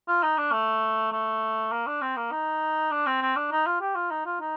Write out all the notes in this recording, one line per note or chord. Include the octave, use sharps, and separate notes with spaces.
F4
D#4
D4
A3
A3
A#3
D4
C4
A#3
D#4
D4
C4
C4
D4
D#4
F4
G4
F4
D#4
F4
D#4